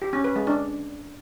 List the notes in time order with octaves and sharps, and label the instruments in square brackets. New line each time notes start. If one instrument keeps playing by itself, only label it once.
[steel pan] G4
C#4
B4
G#3
D4